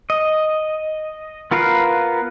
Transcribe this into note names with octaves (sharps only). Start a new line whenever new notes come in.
D#5
B3 F4 A#4 B4 F5